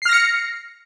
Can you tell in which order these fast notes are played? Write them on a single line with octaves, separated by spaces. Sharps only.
C7 F6 A#6 C#7